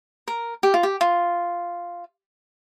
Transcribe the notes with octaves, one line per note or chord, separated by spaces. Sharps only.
A#4
G4
F4
G4
F4